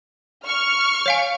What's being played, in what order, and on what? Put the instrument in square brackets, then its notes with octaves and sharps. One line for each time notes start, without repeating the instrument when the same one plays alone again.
[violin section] C#6 F6
[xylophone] C#5 F5 G#5